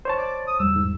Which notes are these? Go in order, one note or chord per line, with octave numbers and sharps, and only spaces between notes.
C5 C#5 A5
D5
D#6
F#1 E2 G3 E6
G#2